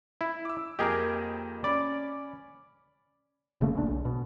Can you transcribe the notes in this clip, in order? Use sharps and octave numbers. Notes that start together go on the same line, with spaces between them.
E4
D6 E6
F2 A#3 G4 G#4 A#4 D#5
C#4 D5 B5 D6
F1 C#3 A3 A#3
E1 A#1 B2 D4
B1
B2